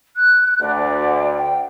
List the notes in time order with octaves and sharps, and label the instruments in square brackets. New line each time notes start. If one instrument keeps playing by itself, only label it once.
[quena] F#6
[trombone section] D2 [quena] D5
[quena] G5